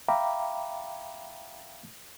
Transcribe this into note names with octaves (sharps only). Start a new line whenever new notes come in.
E5 F5 G5 A#5 B5 D6